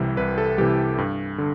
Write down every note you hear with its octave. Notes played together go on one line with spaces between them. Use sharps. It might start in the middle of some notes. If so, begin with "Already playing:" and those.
Already playing: C2 C3 E3 G3
C2 B4
A4
C3 E3 G3 G4
G2
D3